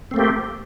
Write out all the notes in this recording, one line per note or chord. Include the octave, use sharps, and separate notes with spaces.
A3 A#3 C4 G4